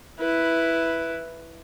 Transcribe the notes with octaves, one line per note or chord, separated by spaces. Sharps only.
E4 B4